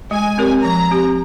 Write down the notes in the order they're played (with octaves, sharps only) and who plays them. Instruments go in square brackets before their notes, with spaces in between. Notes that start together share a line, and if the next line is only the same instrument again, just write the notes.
[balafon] G#3 [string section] G#5
[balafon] C4 G4 A#4 C#5
[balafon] F3 [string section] A#5
[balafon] C4 G4